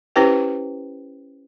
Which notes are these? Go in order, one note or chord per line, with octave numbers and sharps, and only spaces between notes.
C#4 E4 G4 B4 C5 G5